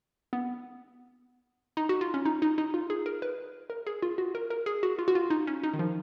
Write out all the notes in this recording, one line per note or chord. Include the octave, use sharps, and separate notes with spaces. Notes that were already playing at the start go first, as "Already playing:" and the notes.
B3
D#4
F#4
F4
C#4
D#4
D#4
D#4
F4
G#4
A#4
B4
A#4
G#4
F4
F#4
A#4
A#4
G#4
F#4
F4
F#4
F4
D#4
C#4
D#4
D#3
F3